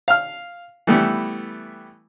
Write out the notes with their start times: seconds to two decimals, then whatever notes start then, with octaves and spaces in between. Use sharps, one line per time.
0.08 F5 F6
0.87 E3 G3 A3 B3 E4 G4